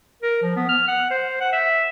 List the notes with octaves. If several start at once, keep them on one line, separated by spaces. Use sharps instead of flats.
A#4
F3
B3
F6
F#5
C5
F#5
E5